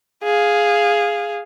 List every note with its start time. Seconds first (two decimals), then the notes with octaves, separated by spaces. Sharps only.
0.24 G#4 F5